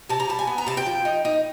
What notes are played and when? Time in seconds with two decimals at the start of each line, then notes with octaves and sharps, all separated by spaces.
0.09 C3 A5
0.20 A#5
0.29 G3 A5
0.39 G#5
0.47 B3
0.58 A#5
0.66 C3 A5
0.77 G5
0.86 F3
1.05 D#4
1.25 D#4